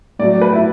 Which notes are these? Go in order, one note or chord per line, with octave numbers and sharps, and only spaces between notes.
A2 F#3 D5
B4
E4